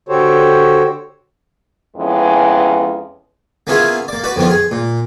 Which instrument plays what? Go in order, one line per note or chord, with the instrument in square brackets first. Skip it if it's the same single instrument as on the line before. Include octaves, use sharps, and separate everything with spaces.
[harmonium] D3 F#4 G4 A4 C5 C#5
[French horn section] F2 E3 G#3 B3 C#4
[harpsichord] A#3 B3 C#4 E4 F4 G#4
A#3 D5
F#4 B4 D5
F2 D#3 B3 F4
G#4
A#2